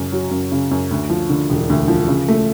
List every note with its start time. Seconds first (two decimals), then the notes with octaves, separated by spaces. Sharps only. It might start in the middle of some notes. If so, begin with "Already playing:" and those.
Already playing: F#2 C#3
0.12 F#3
0.31 F#2
0.52 C#3
0.71 F#2
0.91 D2
1.10 F3
1.30 D3
1.50 E1
1.70 D2
1.88 F3
2.08 C#3
2.28 A3